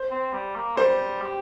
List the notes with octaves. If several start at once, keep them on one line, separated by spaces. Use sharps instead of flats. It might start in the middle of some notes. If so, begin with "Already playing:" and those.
Already playing: C5
C4
G3
A#3
G3 C5
G4